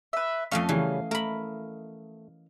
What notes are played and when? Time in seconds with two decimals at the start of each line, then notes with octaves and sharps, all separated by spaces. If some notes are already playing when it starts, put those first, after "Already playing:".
0.13 B4 E5
0.51 F2 A3 C#4 D#5 F5
0.69 C#3 E3 G3 C#4
1.11 A3 A#4 B5